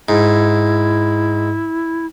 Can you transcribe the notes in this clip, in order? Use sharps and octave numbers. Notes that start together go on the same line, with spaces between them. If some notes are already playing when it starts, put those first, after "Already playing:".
G#2 E4